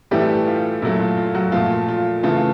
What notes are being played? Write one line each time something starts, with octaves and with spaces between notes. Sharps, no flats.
A2 E3 G3 A3 G4
F4
A#2 F#3 A3 E4
F4
F4
F#3 F#4
A#2 F3 A3 F4
F4
C#3 E3 A3 F4